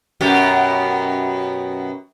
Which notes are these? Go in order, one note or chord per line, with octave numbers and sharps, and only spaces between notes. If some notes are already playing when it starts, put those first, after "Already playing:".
F#2 B2 G4